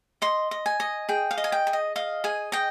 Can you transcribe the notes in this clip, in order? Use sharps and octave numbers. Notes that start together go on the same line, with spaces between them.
D#5 C6
D#5
G#5
D#5
G#4 G5
F5
D#5
G#5
G5
G#4
D#5
D#5 F5
G#4 G#5
D#5 G5